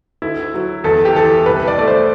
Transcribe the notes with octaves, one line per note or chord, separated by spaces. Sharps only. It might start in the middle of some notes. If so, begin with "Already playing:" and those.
D2 E4
F#3
E2 A4
G4
E3 A4
C2 B4
D5
A3 D5
C5